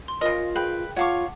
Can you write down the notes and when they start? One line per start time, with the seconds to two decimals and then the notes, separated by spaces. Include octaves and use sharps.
0.08 C6
0.21 C#3 F4 A#4 D#5
0.56 G#4 B4 F5 G5
0.96 F4 C#5 F5 F#5 A5 C#6 D6